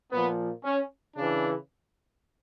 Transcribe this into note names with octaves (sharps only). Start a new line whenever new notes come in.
A#2 F3 B3
C#4
C#3 E3 D4